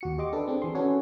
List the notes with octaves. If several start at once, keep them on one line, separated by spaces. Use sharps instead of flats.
D#2 F#4 C#7
G4 D#5 C6 D6
D4 A4 B4
C4 D4 G#4
E3 C6
C#4 F#4 G#4 A4 B4 C#5